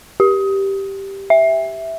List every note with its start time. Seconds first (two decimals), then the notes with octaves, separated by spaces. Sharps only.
0.20 G4
1.30 E5